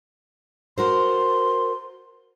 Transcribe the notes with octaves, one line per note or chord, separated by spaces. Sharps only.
F#4 A#4 C5 C6